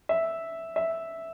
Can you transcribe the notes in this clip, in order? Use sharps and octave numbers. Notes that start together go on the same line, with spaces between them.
E5
E5